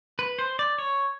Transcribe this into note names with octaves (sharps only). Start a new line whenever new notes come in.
B4
C5
D5
C#5